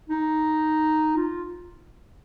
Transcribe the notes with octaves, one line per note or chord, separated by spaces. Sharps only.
D#4
F4